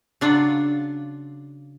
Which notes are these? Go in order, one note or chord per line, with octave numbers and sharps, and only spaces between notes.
C#3 F#3 D4 F4 F#5